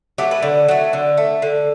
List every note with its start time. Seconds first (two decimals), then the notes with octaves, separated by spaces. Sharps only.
0.18 F#3 A3 G4
0.31 B4
0.43 D3
0.68 F#3 A3
0.93 D3
1.17 A3
1.42 D3